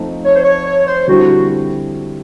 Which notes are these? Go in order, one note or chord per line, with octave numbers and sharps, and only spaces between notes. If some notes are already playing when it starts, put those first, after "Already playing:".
Already playing: F3 A3 C4 D#4
C#5
C5
C#5
C#5
C5
D3 G3 C4 E4 F#4